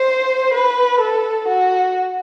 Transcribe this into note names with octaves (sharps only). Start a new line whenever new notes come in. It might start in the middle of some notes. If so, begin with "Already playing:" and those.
Already playing: C5
B4
A4
F#4